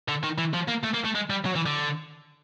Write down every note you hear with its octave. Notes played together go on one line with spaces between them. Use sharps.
D3
D#3
E3
F3
A#3
A3
A#3
A3
G#3
G3
F#3
E3
D3